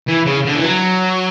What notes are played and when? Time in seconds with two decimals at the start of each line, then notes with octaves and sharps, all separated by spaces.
0.09 E3
0.26 C#3
0.46 D3
0.55 E3
0.64 F#3